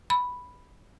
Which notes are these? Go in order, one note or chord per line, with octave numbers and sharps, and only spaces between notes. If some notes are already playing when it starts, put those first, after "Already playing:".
B5